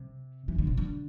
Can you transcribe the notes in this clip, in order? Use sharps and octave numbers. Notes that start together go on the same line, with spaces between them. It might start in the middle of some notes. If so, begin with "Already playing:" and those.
Already playing: C3
E3
D3
C3
D3